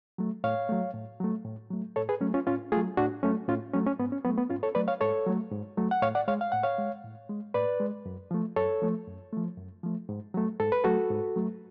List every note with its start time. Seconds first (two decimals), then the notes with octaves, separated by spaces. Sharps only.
0.18 F#3 A3
0.44 A2 C#5 F5
0.69 F#3 A3
0.94 A2
1.20 F#3 A3
1.45 A2
1.71 F#3 A3
1.96 A2 A4 C#5
2.09 G#4 B4
2.21 F#3 A3 C#4
2.34 C#4 F4
2.47 A2 C#4 F4
2.72 A3 F4 G#4
2.77 F#3
2.97 A2 D4 F#4
3.23 F#3 A3 C#4
3.48 A2 C#4 F4
3.73 F#3 A3 C#4
3.87 C#4
3.99 G#2 B3
4.12 C#4
4.24 F#3 A3 B3
4.37 B3
4.50 G#2 C#4 F4
4.63 A4 C#5
4.75 F#3 A3 B4 D5
4.88 C#5 F5
5.01 G#2 A4 C#5
5.26 F#3 A3
5.52 G#2
5.77 F#3 A3
5.91 F#5
6.02 A2 C#5 F5
6.15 D5 F#5
6.28 G#3 C#5 F5
6.41 F5
6.52 A2 F#5
6.63 C#5 F5
6.78 G#3
7.04 A2
7.29 G#3
7.54 A2 B4 D5
7.80 G#3
8.06 F#2
8.31 F3 A3
8.56 F#2 A4 C#5
8.82 F3 A3
9.07 F#2
9.33 F3 A3
9.57 F#2
9.84 F3 A3
10.09 G#2
10.34 F#3 A3
10.59 G#2 A4
10.72 B4
10.84 F#3 A3 F#4 A4
11.10 G#2
11.36 F#3 A3